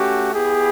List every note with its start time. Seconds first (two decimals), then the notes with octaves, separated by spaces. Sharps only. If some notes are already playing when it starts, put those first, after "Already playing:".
Already playing: A3 C#4 F#4 G4
0.34 B3 E4 G4 G#4